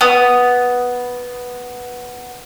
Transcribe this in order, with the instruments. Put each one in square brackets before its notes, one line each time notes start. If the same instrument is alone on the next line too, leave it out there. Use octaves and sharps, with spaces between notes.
[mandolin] B3 D#6